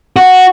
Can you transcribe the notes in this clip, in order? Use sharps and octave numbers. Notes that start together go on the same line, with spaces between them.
F#4